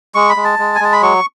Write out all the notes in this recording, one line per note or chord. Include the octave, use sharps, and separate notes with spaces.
G#3 C#6
B5
G#3
A5
G#3
G#5
G#3 A5
B5
F#3 C#6